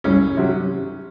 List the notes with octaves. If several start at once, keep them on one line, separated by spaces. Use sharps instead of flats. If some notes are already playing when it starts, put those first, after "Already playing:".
C2 C#4
C3 F#3